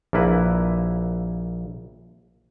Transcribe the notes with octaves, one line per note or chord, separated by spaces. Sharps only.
A#1 A#3 E4 B4